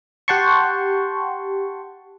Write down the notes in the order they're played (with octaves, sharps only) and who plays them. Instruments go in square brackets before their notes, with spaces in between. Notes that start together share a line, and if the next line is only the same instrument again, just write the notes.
[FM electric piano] G4 F#5 G5 A5 C6 C#6